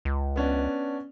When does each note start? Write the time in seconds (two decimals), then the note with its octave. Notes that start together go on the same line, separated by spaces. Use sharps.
0.05 C#2
0.36 B3 C#4 D4